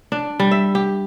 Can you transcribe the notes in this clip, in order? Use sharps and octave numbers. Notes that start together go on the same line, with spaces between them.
D4
G3
E5
G4